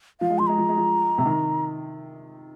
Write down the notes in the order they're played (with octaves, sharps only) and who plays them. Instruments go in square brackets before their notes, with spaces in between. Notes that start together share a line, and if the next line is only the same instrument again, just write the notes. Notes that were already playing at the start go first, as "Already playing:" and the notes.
[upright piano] F3 [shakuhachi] F5
[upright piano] G#3
[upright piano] F3 [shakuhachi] C6
[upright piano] G#3 [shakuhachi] A#5
[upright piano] F3
G#3
F3
C3
D#3